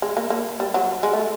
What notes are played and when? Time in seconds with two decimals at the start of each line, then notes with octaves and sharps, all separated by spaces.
0.02 G#3
0.17 A#3
0.30 A#3
0.60 G3
0.74 F#3
1.03 G#3
1.13 A3